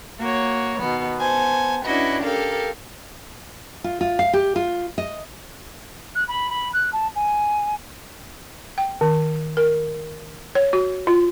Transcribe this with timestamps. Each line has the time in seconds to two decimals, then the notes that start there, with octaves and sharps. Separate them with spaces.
0.19 A#3 F#4 C#5
0.80 B2 D#3 B3
1.19 B3 C5 G#5 A5
1.85 C#4 D4 E4 F#4 B4 D#5
2.24 G4 A4 A#4 F5
3.84 F4
4.01 F4
4.19 F5
4.33 G4
4.56 F4
4.98 D#5
6.15 F#6
6.27 B5
6.49 B5
6.73 F#6
6.92 A5
7.15 G#5
8.78 G5
9.01 D#3
9.57 A#4
10.55 C#5
10.73 F#4
11.07 F4